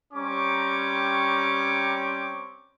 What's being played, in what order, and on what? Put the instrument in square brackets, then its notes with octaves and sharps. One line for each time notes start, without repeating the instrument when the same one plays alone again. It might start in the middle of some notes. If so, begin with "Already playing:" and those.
[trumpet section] G3 C4 C#4 A#5 C#6 D6